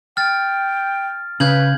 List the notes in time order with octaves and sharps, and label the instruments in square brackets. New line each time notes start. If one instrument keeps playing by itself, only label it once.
[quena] G5 [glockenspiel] F6 A6
[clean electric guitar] C#3 [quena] B4 [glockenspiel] G6 G#6 F#7